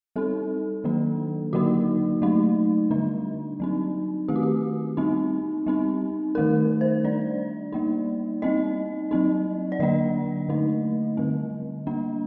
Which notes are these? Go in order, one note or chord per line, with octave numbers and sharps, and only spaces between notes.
G3 C4 D#4 A4
D#3 F#3 A#3 D4
D3 F#3 A#3 D#4 F#4
F#3 A3 D#4
D3 G3 D4
F#3 C4 D#4
D#3 A3 C4 G4
F#4
G4
G3 C4 D#4
G3 C4 D#4
D#3 A3 D#4 A#4
C5
G3 D4 D5
G3 A#3 D#4
G3 C4 D#4 D#5
F#3 C4 D#4
D5
D3 F#3 A#3 D4 D#5
D3 A3 D#4
D3 G3 C4
G3 A#3 D4